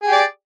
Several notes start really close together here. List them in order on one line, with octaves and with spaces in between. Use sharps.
G#4 G4 D5